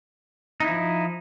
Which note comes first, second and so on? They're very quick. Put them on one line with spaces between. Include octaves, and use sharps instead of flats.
D#4 E4 F3